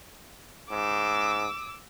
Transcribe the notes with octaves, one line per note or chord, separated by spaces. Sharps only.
G#2 D6 E6